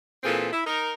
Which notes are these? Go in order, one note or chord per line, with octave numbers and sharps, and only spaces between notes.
A#2 E3 C4 F4 G#4 A4
E4
D#4 A#4